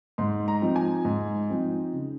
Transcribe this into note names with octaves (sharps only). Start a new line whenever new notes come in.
G#2 C6
A#5
F3 C4 D#4
G#5
G#2
F3 C4 D#4
C#3